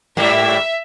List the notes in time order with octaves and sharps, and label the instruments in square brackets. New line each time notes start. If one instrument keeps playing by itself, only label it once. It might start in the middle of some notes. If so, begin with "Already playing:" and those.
[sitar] G#2 G3 A#3 [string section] E5